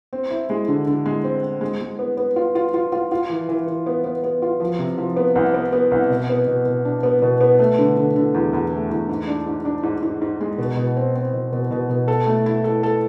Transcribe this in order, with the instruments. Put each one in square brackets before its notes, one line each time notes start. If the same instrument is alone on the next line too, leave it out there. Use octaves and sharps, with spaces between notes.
[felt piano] C4
E4
G#3
D3
D3
G#3
C4
C4
G#3
G#3
B3
B3
F4
F4
F4
F4
F4
E3
E3
E3
B3
B3
B3
F4
F3
C3
F3
B3
C2
B3
B3
C2
B2
B3
B2
B2
D4
B3
B2
B3
A3
D3
D3
D3
E2
E2
A3
E2
G#2
D4
G#2
D4
G#2
G#2
G#2
G#3
B2
B2
C4
C4
B2
B2
B2
B2
A4
A3
E4
A4
A4